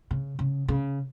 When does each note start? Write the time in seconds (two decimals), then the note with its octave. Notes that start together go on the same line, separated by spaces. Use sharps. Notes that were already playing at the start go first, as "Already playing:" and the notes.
0.11 C#3
0.39 C#3
0.68 C#3